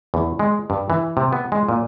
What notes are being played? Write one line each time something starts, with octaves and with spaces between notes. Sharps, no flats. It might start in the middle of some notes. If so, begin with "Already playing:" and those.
E2
G#3
G2
E3
C3
B3
G#3
A#2